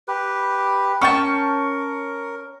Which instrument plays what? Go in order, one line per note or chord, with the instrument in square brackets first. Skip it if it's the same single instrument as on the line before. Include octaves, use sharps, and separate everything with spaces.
[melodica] G4 B4
[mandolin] C#4 G5 A5 [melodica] A#4 [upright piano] C#6